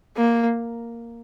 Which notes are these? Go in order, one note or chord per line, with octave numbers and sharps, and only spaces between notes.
A#3